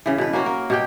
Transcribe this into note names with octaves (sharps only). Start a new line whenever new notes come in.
C#3 E3
B2 B4
A#3 C#4 F#4
A#4
B2 G4 G5